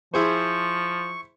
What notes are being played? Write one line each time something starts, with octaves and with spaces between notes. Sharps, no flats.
F3 E4 G#4 C5 C#6